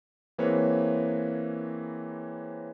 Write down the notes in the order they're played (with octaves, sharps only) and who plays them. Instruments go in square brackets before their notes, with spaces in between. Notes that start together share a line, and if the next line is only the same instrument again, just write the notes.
[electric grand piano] E3 A#3 C4 G#4 B4 C#5